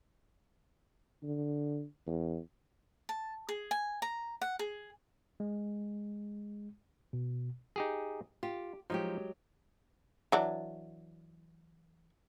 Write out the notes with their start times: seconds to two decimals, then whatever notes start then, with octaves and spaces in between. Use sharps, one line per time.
1.23 D3
2.07 E2
3.09 A5
3.49 G#4
3.71 G#5
4.02 A#5
4.41 F#5
4.59 G#4
5.40 G#3
7.13 B2
7.76 D#4 G4 G#4
8.43 F4 G4
8.90 F3 F#3 G#3 D#4 G4
10.32 E3 F#3 D4